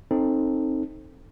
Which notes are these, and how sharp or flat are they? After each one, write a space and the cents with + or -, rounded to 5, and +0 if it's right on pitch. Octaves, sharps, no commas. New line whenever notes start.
C4 +20 D#4 +0 A4 +10